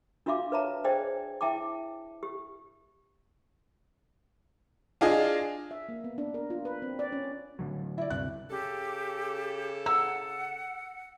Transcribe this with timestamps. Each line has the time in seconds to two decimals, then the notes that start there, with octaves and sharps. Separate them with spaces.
0.26 D4 F4 F#4 E5 F5 D6
0.52 B4 C#5 E5 A5 A#5
0.84 G#4 C5 D5 D#5 G5 G#5
1.41 E4 E5 G5 A5 D6
2.23 G4
5.01 D4 F4 G#4 D#5
5.71 E5
5.89 A#3
6.04 B3
6.18 D4
6.34 A#4
6.50 F4
6.65 B4
6.82 C4
6.99 D5
7.12 C#4
7.59 A2 D3 F#3
7.98 E4 D5
8.10 D2 G2 C3 F#6
8.50 C#3 G4 A4
9.86 F#5 E6